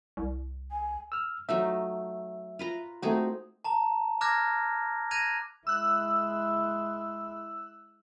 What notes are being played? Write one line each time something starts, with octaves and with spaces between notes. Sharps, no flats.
C2
G#5
E6 F6
F#3 A3 D#4 E5
F4 B4 A#5
A3 C4 D#4 F#4 G#4
A5 A#5
A#5 D6 F6 F#6 G#6 A#6
F#6 G#6 A#6 D#7 F7
G#3 E4 E6 F#6